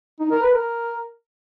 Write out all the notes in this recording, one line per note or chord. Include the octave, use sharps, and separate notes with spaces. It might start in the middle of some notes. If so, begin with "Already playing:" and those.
D#4
A#4
B4
A#4